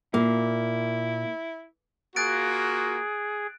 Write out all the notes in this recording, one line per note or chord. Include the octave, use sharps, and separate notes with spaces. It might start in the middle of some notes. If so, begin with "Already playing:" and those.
A#2 A#3 E4
A#3 F4 F#4 G#4 F#6 A6 D7